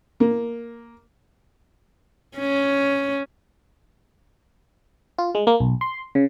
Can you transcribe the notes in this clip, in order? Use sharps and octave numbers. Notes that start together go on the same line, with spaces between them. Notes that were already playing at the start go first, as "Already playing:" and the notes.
A#3
C#4
F4
G#3
A#3
B1
C6
C#3